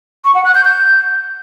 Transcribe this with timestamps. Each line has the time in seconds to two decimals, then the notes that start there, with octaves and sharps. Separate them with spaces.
0.25 C#6
0.35 F#5
0.45 F#6
0.55 G6
0.65 G6